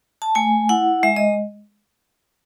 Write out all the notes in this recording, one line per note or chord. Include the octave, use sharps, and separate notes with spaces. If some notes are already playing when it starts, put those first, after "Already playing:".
A5
A3 G#5
E4 F#5
G#3 E5
D#5